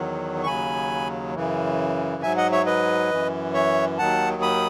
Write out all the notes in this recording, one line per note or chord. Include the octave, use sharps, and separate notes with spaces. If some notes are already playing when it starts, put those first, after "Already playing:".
Already playing: E2 D#3 F#3
C#6
D#2 C#3 F#3 G#5 B5
F#2 C#3 E3
G#2 F#3 E5 G#5
D#5 F#5
C#5 E5
B4 D#5
F#2 E3
C#5 E5
D#2 D#3 F#3 F#5 A5
B5 D#6